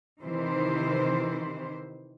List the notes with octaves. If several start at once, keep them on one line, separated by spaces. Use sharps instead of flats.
C3 D#3 E3 C5